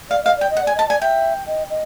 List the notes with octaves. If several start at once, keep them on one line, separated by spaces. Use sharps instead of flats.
D5 F5
D#5 F5
D5 G5
D#5
F#5
D5 G#5
D#5 A5
D5 G#5
E5 G5
D#5
D#5